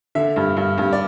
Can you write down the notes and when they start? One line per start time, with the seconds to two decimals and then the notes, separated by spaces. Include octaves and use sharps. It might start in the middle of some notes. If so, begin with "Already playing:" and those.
0.15 D3 E5
0.36 G2
0.57 G2
0.78 G2
0.93 D5